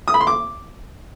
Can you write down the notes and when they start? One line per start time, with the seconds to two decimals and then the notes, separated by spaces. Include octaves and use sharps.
0.08 D#6
0.14 B5
0.20 C6
0.27 D6